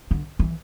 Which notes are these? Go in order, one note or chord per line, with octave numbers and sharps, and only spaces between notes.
D3
E3